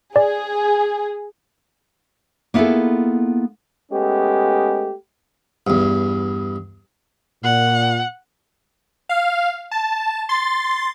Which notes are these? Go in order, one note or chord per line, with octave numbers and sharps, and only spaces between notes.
G#4 D5
A#3 B3 E4 F4 G#4 A4
G#3 A3 B3 C#4 G4
E2 G2
A#2 F#5
F5
A5
C6 A6